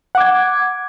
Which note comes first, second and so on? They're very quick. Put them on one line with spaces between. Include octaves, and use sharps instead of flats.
F#5 D6 G#6